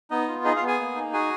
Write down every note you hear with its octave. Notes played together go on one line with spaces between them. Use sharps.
B3 D#4 D#5
F4
D#4 G#4 D#5
F4 F5
B3
G#4 G#5
A#3
D#4
F#4 G#4 G#5